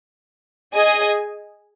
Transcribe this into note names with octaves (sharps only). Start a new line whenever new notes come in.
G#4 D#5 G#5